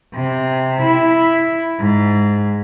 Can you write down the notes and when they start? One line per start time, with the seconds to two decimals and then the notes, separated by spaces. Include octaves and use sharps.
0.15 C3
0.82 E4
1.80 G#2